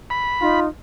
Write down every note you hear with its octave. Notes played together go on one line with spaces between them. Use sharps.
B5
D#4 F4